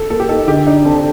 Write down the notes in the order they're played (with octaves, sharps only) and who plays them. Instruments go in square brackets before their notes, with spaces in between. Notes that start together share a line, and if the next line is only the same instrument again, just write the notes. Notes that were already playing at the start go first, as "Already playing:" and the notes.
Already playing: [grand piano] A4
[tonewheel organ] A#3 [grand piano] A4
[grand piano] G4
[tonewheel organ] D#4 [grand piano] A4
[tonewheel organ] D3 [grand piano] G4
[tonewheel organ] D4 [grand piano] D#4
[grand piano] C4 [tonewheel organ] A4